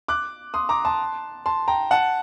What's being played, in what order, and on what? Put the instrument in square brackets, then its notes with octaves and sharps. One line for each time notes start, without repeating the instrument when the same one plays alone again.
[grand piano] D6 F#6
C6 D#6
A#5 D6
A5 C6
A5 C6
G5 A#5
F#5 A5